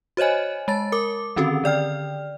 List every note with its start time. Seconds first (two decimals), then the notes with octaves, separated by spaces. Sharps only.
0.17 F#4 C5 C#5 D#5 G#5
0.68 G#3 A5 A6
0.92 A#4 D6
1.36 D3 D#3 C4 C#4 F#4 A4
1.64 D3 D5 G5 F6